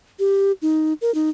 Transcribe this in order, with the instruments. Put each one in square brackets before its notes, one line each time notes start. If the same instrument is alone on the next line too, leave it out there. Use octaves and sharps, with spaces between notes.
[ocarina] G4
D#4
A#4
D#4